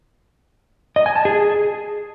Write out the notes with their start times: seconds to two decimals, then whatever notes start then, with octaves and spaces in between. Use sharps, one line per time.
0.96 D#5
1.06 G#5
1.16 A5
1.25 G#4